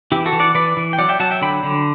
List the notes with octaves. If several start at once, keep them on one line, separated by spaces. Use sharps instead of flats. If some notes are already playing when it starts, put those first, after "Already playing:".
E3 E4 G4
F#4 A4
E3
D5 F#5
E3 B4 D5
E3
G5
F#3 D5 F#5
E5 G5
F#3 F#5 A5
E5 G5
D3 G5 B5
D3